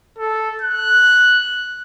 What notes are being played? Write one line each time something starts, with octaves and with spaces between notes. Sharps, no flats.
A4
F#6